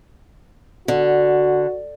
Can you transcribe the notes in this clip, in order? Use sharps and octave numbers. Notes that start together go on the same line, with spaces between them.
D3 F#4